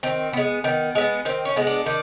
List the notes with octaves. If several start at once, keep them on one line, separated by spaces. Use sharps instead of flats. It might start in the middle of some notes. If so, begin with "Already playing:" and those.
D#3 C4
G#3 B3
D#3 B3
G#3 B3
D#3 C4
C#4
G#3 B3
D4
D#3 D4